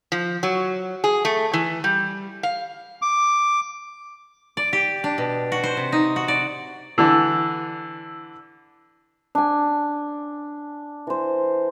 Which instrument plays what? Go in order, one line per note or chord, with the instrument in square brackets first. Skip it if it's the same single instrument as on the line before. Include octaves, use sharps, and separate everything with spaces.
[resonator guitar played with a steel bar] F3
F#3
G#4
A3
E3
G3
F5
[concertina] D6
[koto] D5
G4
D4
B2
F#4
C5
C3
D#4
F#4
D5
[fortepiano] D3 E3
[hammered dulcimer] D4 G#5
E3 C5